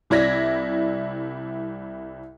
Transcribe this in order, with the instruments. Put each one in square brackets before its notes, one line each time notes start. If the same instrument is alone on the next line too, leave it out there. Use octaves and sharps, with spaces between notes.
[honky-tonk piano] C2 E4 D5 G#6 A#6 B6